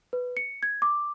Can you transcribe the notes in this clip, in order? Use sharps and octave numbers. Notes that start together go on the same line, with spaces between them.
B4
C#7
G#6
D6